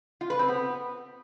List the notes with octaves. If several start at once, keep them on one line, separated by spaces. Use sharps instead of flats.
F4
B4
C4
B3